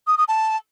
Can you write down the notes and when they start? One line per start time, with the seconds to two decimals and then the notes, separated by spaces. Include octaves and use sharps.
0.07 D#6
0.18 D#6
0.28 A5